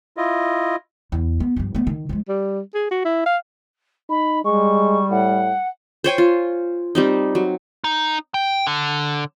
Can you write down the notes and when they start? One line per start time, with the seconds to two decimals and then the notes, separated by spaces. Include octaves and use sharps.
0.17 E4 F4 D#5
1.12 E2
1.40 B3
1.56 G2 F3
1.75 A3 B3
1.87 D#3
2.09 F3 G#3
2.28 G3
2.74 G#4
2.91 F#4
3.05 E4
3.26 F5
4.09 D#4 B5
4.44 G3 G#3 C#6
5.10 A2 F#5
6.04 C5 C#5 G5 G#5
6.18 F4
6.95 G3 C4 D#4
7.35 F#3
7.84 D#4
8.34 G5
8.67 D3